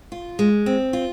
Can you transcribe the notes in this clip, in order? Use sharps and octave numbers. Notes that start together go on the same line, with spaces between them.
F4
G#3
C4
F4